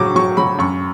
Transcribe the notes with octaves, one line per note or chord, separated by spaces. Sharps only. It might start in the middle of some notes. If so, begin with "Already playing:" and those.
Already playing: A2 F#3 C#6 D6
F#3 C#6
F#3 B5
F#2 C#6